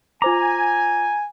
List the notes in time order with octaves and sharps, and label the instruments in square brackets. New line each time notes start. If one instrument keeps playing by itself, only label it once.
[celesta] F4 C5 D6 [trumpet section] G#5 [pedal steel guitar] A#5